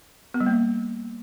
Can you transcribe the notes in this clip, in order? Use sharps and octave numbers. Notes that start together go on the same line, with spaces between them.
B3
G3
A#3